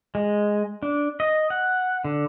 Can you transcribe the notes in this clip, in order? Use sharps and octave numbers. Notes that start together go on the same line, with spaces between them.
G#3
D4
D#5
F#5
D3